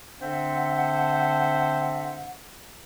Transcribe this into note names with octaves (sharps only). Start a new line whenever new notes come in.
D3 C4 D4 C5 E5 F#5